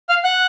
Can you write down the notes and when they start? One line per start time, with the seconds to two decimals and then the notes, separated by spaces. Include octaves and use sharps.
0.09 F5 F6
0.24 F#5 F#6